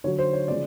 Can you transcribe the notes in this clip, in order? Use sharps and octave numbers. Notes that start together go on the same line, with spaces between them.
D3 F#3 C#5
C5
C#5
C#3 F3 G#3 D5